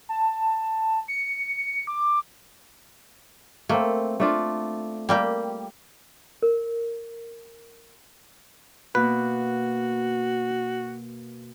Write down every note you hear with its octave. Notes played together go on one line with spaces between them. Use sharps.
A5
C#7
D6
A3 A#3 C4
A3 D4 F4
G3 A#3 G4
A#4
B2 A#3 F#4 B4